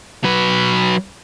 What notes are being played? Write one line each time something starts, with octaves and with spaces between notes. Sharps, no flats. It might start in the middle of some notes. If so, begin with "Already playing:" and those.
F#3 B4